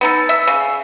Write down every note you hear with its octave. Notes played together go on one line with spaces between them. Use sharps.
B3 D#4 A4
E5
C#3